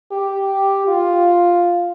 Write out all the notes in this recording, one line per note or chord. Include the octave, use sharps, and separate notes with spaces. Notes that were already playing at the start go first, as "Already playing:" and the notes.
G4
F4